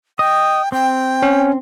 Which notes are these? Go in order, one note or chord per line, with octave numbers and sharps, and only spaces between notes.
D#5 G5
C4 G5
C#4